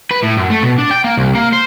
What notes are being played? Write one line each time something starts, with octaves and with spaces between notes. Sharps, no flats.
B4
A2
F#2
A3
B2
D4
G5
A#3
C2
A#3
C5